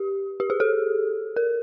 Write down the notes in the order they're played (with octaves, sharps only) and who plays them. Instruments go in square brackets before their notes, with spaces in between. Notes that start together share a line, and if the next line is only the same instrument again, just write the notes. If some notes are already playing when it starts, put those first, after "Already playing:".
Already playing: [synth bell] G4
G4
G#4
A4
A#4